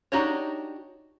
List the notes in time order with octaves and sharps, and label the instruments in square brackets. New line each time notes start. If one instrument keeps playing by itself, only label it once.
[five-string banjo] D4 D#4 F#4 G4 C#5